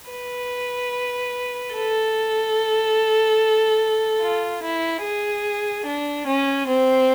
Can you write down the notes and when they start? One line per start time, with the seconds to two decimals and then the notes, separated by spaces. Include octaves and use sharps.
0.10 B4
1.75 A4
4.21 F4
4.63 E4
5.03 G#4
5.86 D4
6.27 C#4
6.68 C4